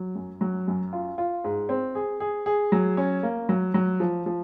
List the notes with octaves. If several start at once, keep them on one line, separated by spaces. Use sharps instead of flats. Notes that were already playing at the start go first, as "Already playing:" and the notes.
Already playing: F#3
F#2
F#3
F#2
F4
F4
G#2
C4
G#4
G#4
G#4
F#3
C#4
A#3
F#3
F#3
F3
F3